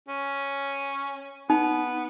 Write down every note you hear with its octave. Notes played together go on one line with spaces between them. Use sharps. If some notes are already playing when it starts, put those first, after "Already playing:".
C#4
B3 D#4